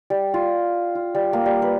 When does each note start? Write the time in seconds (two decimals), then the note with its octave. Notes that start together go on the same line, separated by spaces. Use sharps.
0.10 G3
0.34 F4
0.95 F4
1.15 G3
1.33 A#3
1.46 G3
1.62 B4